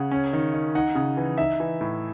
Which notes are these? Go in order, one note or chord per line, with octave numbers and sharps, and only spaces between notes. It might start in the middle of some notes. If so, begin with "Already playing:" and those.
Already playing: C#3 F#5
C#4
D#3
D#3
D#4 F#5
C#3
E3
D#4 E5
E3
A2